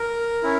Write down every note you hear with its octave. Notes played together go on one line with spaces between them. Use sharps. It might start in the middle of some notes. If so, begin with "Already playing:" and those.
Already playing: A#4
C#4 E4